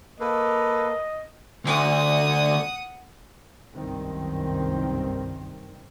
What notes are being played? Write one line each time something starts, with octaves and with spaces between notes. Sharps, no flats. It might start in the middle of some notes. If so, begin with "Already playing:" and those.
A#3 A4 B4 D#5
D2 F#5 D#6
F#1 C2 G2 D#3 C4